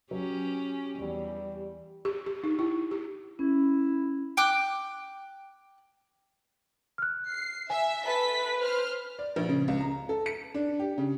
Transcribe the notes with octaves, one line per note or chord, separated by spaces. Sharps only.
F#3 C#4 G4
E2 G3
G4
G4
D#4
E4
G4
C#4 E4
G5 D6 F#6
F6 F#6
C7
E5 G#5
A4 B4 B6
C5 F6
D5
A#1
C#3
C#2
A#5
A4
C#7
D4
G4
C#3